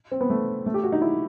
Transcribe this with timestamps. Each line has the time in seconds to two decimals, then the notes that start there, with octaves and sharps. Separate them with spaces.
0.12 C4
0.21 B3
0.30 A3
0.66 A3
0.74 G4
0.84 F#4
0.92 D#4
1.02 E4